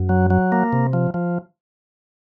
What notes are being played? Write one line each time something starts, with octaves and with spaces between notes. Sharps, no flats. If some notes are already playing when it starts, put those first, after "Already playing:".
Already playing: F#2
F#3
F#3
A#3
C3
F3
F3